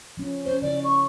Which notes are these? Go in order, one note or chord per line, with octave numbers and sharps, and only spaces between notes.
F3 C#4
C#4 C5 C#5
C#3 F3 E4 D5
C#6